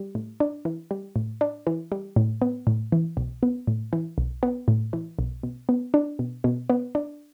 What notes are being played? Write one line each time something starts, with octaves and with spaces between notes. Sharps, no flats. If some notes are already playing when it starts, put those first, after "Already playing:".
Already playing: G3
A2
D4
E3
G3
A2
D4
E3
G3
A2
B3
A2
E3
B1
B3
A2
E3
B1
B3
A2
E3
B1
B2
B3
D4
B2
B2
B3
D4